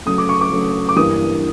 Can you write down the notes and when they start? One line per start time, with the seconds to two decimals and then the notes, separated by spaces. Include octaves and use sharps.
0.05 C#3 F#3 A3 D#6
0.18 D6
0.29 C#6
0.41 D6
0.51 C#3 F#3 A3
0.89 D6
0.96 G2 E3 G3 A#3 D#6